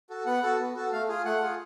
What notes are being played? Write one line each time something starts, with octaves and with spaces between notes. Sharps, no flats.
F#4 A4
B3 F#5
F#4 A4
B3
F#4 A4
A3 F5
F4 G#4
A3 F#5
F4 G#4